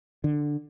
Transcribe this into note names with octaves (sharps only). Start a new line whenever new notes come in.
D3